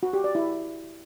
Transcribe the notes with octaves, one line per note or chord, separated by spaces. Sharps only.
F#4
G4
D5
E4